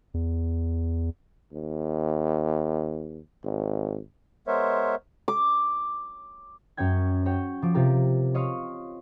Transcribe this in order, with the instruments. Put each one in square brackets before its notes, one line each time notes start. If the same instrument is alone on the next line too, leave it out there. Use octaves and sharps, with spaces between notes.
[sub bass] E2
[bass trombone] D#2
G#1
[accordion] G#3 B3 A#4 C5 C#5 E5
[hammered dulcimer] D6
[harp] F#2 C#4 C#5 G5 G#6
F#4 C#5 G5
F3 D6
C3 F4 G4 A#4
C#5 D#5 F5 C6 C#6